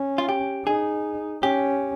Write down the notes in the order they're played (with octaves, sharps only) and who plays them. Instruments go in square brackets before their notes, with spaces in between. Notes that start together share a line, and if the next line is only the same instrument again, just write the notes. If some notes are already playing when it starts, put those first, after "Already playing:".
Already playing: [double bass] C#4
[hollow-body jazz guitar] F4
G4
[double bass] D#4 [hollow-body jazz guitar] G#4
[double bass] C#4 [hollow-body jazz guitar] G4